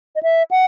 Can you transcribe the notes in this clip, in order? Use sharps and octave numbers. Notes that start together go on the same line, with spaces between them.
D#5
E5
F#5